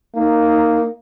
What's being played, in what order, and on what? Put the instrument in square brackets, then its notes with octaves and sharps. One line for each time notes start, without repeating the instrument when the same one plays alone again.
[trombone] A#3 [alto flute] D#4